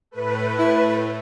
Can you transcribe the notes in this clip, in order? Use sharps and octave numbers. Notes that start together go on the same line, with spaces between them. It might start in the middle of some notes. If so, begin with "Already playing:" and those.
A2 A3 B4
E4